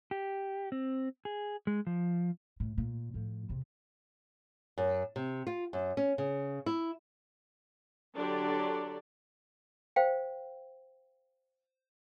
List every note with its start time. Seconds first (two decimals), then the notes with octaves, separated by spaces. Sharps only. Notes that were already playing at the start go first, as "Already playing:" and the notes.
0.11 G4
0.72 C4
1.25 G#4
1.67 G#3
1.87 F3
2.60 A2
2.78 A#2
3.14 A2 F3
3.49 E2 C3
4.78 F#2
5.16 C3
5.47 F4
5.73 F#2
5.97 C#4
6.18 C#3
6.66 E4
8.15 D3 F#3 D4 G4 D5
9.96 C5 F5 G5